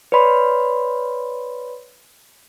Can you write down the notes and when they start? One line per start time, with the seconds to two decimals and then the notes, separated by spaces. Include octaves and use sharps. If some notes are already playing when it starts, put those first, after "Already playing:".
0.12 B4 C#5 D5 B5 C6